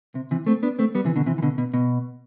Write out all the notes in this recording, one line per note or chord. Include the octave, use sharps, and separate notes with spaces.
C3
C3 E3
A3 C4
B3 D4
A3 C4
G3 B3
C3 E3
B2 D3
C3 E3
E3
B2 D3
B2
B2